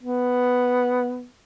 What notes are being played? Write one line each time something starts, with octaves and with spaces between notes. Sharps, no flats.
B3